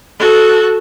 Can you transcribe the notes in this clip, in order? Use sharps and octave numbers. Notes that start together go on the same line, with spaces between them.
F#4 A4